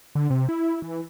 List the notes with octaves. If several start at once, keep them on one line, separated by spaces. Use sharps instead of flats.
D3
C3
E4
E3